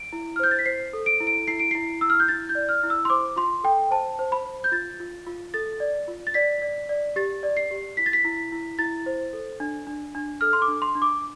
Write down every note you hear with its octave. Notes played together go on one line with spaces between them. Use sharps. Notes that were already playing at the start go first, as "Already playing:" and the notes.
Already playing: D7
E4
F6
C5 G6
A6
B6
C5 C7
A4
D7
E4
D7
E4 C7
D7
E4 C7
E4 E6
F6
G6
E4 A6
G6
D5
F6
E4
E6
C6
C5 D6
F4 C6
A4 G5
C5 A5
C5
B5
C5
G6
F4 A6
F4
F4
A4 A6
D5
F4
A6
D5 B6
D5
D5
G4 A6
D5
C7
G4
E4 B6
A6
B6
E4
E4
E4 A6
C5
A4
D4
D4
D4
A4 F6
C6
D6
D4
C6
D4
D6